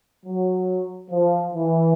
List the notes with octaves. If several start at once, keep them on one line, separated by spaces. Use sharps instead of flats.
F#3
F3
E3